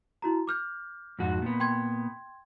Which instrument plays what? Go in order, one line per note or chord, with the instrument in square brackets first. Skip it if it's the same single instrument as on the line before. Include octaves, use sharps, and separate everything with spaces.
[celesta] E4 F#4 A#5
D6 F6 G6
[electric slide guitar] F2 G#2 F#4
A#2 B3
[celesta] G5 C6 G#6